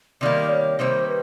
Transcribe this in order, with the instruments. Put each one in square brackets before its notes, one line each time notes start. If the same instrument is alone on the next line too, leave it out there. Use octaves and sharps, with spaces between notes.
[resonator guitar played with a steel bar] C3 D#3 G3 A#3 [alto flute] D5
[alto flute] C#5
[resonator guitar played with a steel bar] C3 D#3 G3 A#3 [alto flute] C5
[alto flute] B4